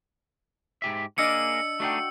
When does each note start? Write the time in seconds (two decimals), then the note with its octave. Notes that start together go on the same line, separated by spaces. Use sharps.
0.82 G#2 G4 E5
1.18 A#3 D4 G#4 A#4 D5 D#5 E6 C#7
1.80 A3 D4 D#4 F#4 F#5 G5